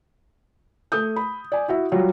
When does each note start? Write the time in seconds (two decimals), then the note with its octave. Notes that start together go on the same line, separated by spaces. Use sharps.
0.92 A3 D#6 G6
1.16 B5
1.52 D5 G#5
1.68 E4 F#4 E5
1.92 F#3 G3 F4 F#4